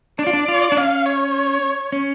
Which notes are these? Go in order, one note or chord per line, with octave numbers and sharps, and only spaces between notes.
D4 D5
F4
D4
F4
D4
C#4 F5
C#5
C#4